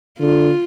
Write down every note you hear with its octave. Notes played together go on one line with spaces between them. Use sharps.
D3 F4